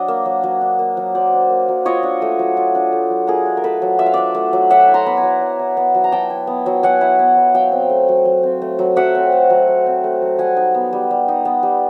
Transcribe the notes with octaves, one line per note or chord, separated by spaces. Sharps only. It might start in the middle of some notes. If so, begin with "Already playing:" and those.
Already playing: F#3 D4 D#5
A#3
F#3
F#3
D4
A#3
F#3
F#3 C5 D5
D4
A#3
F#3
F4 C#5 D#5
D4
A3
F#3
F4
D4
A3
F#3
F4 G#4 A#4
D4
A#4
A3 A4 B4
F#3
F4 E5
F5
D4 D5 E5
A3
F#3
F#3 E5 F#5
E4
A#5 C6
B3 B5
G#5 A#5
F#3
F#3
E4
B3
F#3
A#5
F#3 G5 A5
E4
B3
F#3
F#3 F#5 G#5
E4
B3
F#3
F#3 F5 G5
C4
A3
F#3
F#3
C4
A3
F#3
F#3 E5 F#5
C4
A3
F#3
F#3
C4
A3
F#3
G3 F#5 G#5
D#4
B3
G3
G3
D#4
B3
G3